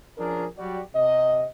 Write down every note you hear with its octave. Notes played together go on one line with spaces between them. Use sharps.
F3 C#4 D4 G#4 A#4
F#3 G3 F#4 G4 D5
C3 D#5